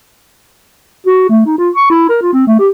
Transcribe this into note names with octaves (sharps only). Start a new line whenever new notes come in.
F#4
A3
D#4
F4
C#6
E4
A#4
F4
C4
A3
G4